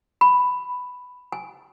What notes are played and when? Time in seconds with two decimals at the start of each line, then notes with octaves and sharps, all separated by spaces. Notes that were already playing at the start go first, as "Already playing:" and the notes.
0.21 B5
1.32 G#5